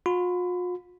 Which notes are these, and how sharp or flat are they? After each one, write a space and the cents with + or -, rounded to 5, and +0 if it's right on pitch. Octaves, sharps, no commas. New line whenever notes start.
F4 +45 B5 +30